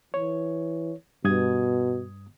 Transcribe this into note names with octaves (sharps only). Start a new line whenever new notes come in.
E3 C#5
G2 B2 D#6 G#6